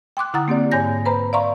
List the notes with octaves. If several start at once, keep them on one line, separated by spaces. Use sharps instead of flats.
G5 C6 D6 F#6
D3 E4 F#5 A#5 D#6 A6
A#3 C4 G4 D5
G#2 C#5 G#5 G6 A#6
B4 C5 A#5 B5
D5 E5 F5 A#5 C6 C#6